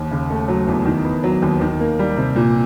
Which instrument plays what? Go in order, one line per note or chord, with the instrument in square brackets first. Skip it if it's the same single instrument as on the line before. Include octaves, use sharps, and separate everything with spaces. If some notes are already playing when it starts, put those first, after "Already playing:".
Already playing: [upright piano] D#2
C#3
A3
F#3
E2
D#3
B3
F#3
D#2
D#3
A#3
G3
C3
A#2